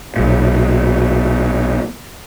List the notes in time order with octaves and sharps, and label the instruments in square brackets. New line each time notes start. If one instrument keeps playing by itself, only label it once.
[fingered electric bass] B1 A#2